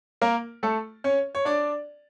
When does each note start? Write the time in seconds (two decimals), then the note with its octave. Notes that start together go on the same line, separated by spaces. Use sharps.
0.21 A#3 A#4
0.63 A3 A4
1.04 C#4 C#5
1.35 C#5
1.45 D4 D5